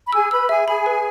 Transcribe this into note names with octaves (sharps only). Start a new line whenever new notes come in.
B5
G#4 G#5 E6
B4 B5 E6
G#4 E5 G#5
G#4 G#5 B5
B4